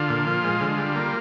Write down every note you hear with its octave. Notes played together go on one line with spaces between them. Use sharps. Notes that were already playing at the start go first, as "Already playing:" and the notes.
Already playing: D3 F4
A#2
F3
G#3
D3
G3
A#3